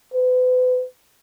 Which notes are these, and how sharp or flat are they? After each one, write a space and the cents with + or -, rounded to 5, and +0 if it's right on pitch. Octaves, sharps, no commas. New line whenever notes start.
B4 +40